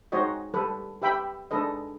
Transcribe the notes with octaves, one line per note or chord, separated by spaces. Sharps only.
G#3 D#4 F#4 C5 C#5 D#5
G3 A4 B4
G4 B4 E5 G5 B5
G#3 D4 A4 B4 D#5